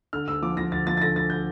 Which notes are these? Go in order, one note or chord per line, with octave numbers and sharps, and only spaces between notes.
D3 F6
D2 E6
F3 D6
F3 A#6
D2 A6
F3 A6
A6
D3 A#6
D2 A6
G6